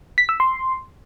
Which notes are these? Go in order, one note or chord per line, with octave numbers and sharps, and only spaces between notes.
B6
E6
C6